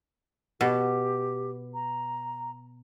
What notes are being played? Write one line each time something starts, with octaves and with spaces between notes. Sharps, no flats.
B2 G4
A#5